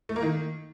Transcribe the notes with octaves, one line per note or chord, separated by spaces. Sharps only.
A3
A#3
D#3